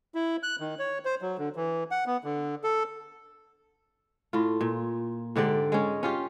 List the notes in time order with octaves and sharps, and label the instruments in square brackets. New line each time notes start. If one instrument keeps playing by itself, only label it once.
[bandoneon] E4
F#6
D#3
C#5
C5
F#3
D3
E3
F#5
B3
D3
A4
[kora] A2 F4
A#2
G#2 D3 G4 D5
G#3 C#4
C#4 F4 G4